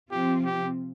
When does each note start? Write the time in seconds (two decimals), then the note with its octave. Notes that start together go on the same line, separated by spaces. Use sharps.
0.10 C3 F3 C4 F4 G4
0.45 G4